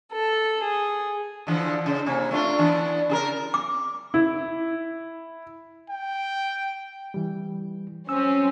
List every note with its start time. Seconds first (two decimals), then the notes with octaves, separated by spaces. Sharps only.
0.13 A4
0.63 G#4
1.47 D3 E3 F3
1.86 C#3
2.06 C3 A#3
2.31 A3 D4 F4
2.58 E3 B3 D4
3.09 C#3 G#4 A#4
3.54 D6
4.14 E4
5.90 G5
7.14 E3 G3
8.09 F#3 C4 C#4 E6